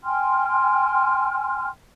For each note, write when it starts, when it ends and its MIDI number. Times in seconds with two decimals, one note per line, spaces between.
0.04 1.68 79
0.04 1.68 80
0.04 1.68 84
0.04 1.68 89